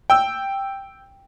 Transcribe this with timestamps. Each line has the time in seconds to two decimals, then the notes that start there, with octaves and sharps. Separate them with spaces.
0.10 G5 E6